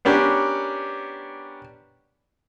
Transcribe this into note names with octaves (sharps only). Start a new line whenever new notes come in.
B3 C#4 D4 G4 A#4